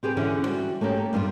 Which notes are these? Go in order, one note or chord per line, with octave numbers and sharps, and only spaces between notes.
C4 G4 G#4 B4
D3 E3 C#4 C5 E5 F#5
G3 F#4
A3 A#3 C#4 G4
A4
G2 G3 B3 D4 F4